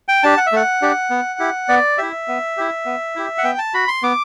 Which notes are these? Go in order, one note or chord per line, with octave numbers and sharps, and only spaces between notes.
G5
D4 G4 A5
F#5
E5
A3 F#5
D4 G4
B3
E4 G4
B3 D5
E4 G4 E5
B3
E4 G4
B3
E4 G4
F#5
B3 G5
A5
F#4 B5
C6
B3 D6